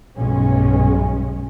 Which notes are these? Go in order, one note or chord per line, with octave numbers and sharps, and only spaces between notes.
B1 G2 G#3 C#4